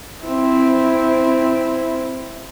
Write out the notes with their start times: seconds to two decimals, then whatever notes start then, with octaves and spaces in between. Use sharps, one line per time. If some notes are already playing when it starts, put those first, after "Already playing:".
0.25 C4 E4